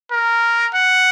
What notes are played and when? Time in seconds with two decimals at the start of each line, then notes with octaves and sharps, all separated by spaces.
0.12 A#4
0.74 F#5